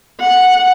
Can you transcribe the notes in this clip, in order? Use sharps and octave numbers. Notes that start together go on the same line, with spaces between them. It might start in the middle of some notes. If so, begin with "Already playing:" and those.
F#5